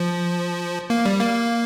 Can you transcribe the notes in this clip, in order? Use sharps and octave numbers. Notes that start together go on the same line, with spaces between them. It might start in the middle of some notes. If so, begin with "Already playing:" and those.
Already playing: F3
A#3
G3
A#3